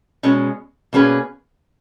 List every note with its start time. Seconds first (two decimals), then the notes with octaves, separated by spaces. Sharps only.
0.23 B2 G#3 C#4
0.93 B2 A#3 C#4 G#4 B4